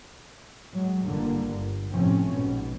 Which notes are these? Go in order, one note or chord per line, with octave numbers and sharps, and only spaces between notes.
F#3 G#3
G1 D3 G3 A#3
G1
A2 C3 F3 A3 C4 C#4
A#1 G#2 B2